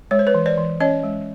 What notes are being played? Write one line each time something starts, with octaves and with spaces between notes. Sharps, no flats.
G#3 C#5
C5
B4 C#5
E3
C5 D5
E3
C#4 C#5 D#5
G#3